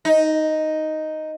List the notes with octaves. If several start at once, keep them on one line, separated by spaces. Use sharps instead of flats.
D#4